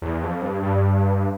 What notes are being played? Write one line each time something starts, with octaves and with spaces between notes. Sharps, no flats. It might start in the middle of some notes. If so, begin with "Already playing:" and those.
E2
F2
G2
G2